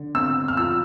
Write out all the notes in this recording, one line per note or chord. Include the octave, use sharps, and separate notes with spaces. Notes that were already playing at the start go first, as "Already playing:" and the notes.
Already playing: D3
C4 E6
F6
F3 E6